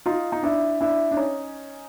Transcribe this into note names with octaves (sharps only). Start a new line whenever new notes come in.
D#4 F4
D#4
D4 E4
D4 E4
D4
C#4 D#4